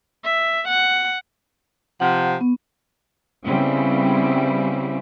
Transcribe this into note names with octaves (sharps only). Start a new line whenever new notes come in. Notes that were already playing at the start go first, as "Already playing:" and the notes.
E5
F#5
C3 F3 F#5
B3
C#3 G3 B3 C4 E4